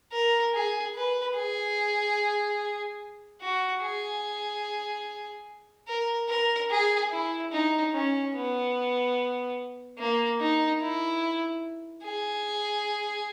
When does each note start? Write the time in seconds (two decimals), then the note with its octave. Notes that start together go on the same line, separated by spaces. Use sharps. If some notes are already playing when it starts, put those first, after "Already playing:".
0.13 A#4
0.54 G#4
0.95 B4
1.36 G#4
3.41 F#4
3.82 G#4
5.88 A#4
6.29 A#4
6.70 G#4
7.12 E4
7.52 D#4
7.94 C#4
8.34 B3
9.98 A#3
10.41 D#4
10.82 E4
12.04 G#4